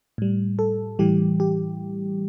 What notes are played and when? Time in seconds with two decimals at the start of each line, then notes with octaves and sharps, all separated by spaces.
0.18 A2 G3
0.59 A4
0.99 A2 E3 G3 G4
1.40 G4